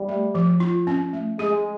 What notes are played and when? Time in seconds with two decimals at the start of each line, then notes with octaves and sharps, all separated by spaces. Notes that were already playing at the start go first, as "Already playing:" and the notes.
Already playing: G3
0.08 A3
0.35 F3
0.60 F4
0.87 C#4
1.13 A3
1.39 G#3 G#4